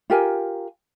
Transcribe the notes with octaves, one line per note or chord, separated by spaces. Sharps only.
F4 G4 A#4 G#5